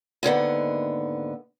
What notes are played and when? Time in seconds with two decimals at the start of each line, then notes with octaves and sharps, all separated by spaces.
0.23 D#2 G#2 D3 B3